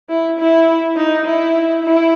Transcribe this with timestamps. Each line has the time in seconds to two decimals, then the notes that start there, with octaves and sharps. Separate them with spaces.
0.09 E4
0.39 E4
0.97 D#4
1.26 E4
1.84 E4